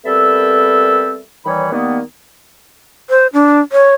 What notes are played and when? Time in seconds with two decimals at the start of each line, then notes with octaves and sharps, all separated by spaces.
0.05 G3 B3 C4 A4 A#4 E5
1.45 D#2 D#3 E3 G3 C#5 B5
1.72 D#3 G3 A#3 B3
3.10 C5
3.33 D4
3.72 C#5